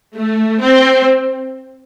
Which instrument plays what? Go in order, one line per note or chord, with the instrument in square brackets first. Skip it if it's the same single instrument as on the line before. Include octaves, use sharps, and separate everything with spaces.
[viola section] A3
C4